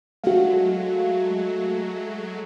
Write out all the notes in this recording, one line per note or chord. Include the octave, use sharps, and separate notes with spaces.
F#3 G#3 A3 F#4 F5